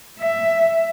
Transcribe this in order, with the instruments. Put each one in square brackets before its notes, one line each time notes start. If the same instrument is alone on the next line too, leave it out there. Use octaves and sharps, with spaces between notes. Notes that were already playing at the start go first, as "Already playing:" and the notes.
[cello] E5